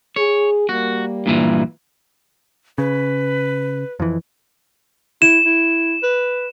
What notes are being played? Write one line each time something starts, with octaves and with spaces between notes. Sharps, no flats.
G#4 C#5
G3 A#3 F#4
G2 A#2 E3
C#3 B4
F2 E3
E4 E7
E4
B4